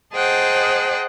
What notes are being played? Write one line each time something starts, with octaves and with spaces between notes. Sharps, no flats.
G#4 C5 D#5 F#5 G5 A5